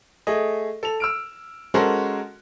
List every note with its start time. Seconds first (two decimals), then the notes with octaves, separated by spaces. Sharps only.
0.27 A3 G#4 D#5
0.83 A4 F7
1.00 E6 F6 D7
1.74 G#3 C#4 F#4 A4 A#4 C5